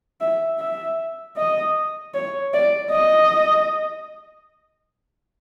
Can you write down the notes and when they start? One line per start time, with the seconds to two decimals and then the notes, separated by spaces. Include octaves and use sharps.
0.21 E5
0.59 E5
1.37 D#5
2.14 C#5
2.54 D5
2.92 D#5